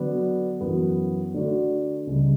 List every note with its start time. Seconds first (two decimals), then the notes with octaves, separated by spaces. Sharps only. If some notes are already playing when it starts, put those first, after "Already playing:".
Already playing: D3 F#3 B3 D4
0.60 F#2 E3 B3 F#4
1.34 D3 A3 D4 F#4
2.07 C#2 C#3 G3